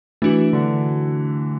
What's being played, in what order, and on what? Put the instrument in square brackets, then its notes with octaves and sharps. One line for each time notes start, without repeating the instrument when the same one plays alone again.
[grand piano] E3 [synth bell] A3 D4 F#4
[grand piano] D3